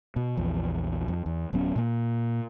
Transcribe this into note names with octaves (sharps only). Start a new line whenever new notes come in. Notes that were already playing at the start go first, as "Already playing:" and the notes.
B2
A#1 E2 F3
F2
E2
D1 F#3 B3 C#4
A#2 A#3